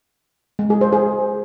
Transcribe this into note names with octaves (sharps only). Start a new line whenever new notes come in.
G#3
G#4
C5
G#4